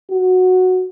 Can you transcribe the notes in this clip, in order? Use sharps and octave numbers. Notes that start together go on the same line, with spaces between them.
F#4